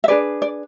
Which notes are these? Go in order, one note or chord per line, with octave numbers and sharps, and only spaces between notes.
E5
D4 G#4 B4 D5
D5